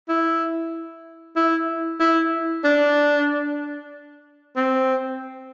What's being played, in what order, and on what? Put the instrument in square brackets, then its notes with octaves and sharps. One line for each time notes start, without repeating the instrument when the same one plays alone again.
[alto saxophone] E4
E4
E4
D4
C4